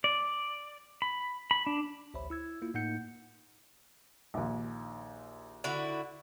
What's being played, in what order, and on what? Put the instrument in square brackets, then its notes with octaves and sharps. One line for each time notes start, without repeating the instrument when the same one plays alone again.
[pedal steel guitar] D5
B5
B5
D4
[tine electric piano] A1 D2 C5 C#5 E5 B5
E4 E6 G#6
A#3 E4 F4
A2 A#3 D#4 F#5 G6 C#7
[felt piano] A#1 D#2
[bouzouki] D3 E4 F#4